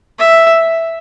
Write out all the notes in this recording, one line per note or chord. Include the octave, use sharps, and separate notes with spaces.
E5